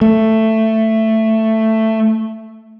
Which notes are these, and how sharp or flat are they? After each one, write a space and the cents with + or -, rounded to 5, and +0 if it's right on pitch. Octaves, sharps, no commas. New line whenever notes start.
A3 +10